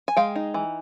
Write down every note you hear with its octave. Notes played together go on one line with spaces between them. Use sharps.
G#5
G#3 F5 G5
D#4
E3